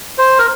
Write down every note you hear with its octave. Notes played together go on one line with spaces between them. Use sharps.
C5
A#4